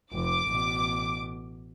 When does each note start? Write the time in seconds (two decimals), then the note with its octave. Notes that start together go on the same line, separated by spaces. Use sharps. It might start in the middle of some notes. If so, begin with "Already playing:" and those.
0.13 F1 D6
0.48 A1 B2